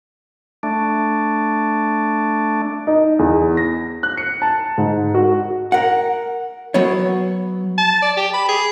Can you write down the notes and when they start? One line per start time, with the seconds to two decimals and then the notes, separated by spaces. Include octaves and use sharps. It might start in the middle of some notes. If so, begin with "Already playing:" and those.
0.63 A3 D4
2.87 D#4
3.19 E2
3.57 A#6
4.03 F#6
4.17 C#7
4.42 A5
4.78 G#2
5.14 F#4
5.72 A#4 F#5
6.74 F#3 B3 C#5
7.78 A5
8.02 D5
8.17 G4
8.34 B5
8.49 G#4